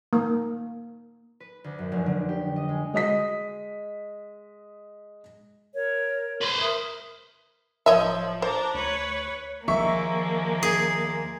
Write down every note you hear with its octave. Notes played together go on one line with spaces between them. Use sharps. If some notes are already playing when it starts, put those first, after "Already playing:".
A#3
B4
D2
F#2
F1
D3
G4
D#5
G#3
G#3 D#5 D#6 B6
A#4 C#5
B4 C5
A#4 E5 D#6
D1 F3 C#5 D#5 E5
D4 C5 A#5
D2 B4 C#5
D#2 F3 G#3 A#3 E5 C#6
G#4